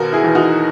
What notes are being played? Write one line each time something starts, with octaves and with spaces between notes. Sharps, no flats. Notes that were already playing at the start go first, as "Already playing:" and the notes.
Already playing: D#2 B2 F#4 A#4
E4 G#4
E2
D#4 F#4